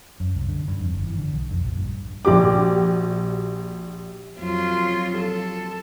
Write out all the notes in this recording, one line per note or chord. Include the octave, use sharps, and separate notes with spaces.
F#2
C2
D3
G2
F2
G1
E3
D3
B1
F2
A#1
G2
A#1 F#4 G4 D6
F2 F#3 F4
A4